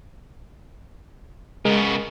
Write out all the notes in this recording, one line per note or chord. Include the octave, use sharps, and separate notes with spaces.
C#3 G#3 B3 A#4